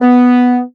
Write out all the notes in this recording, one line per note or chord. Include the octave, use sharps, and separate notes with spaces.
B3